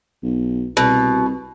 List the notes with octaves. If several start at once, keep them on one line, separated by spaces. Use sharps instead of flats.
B1
C2 B2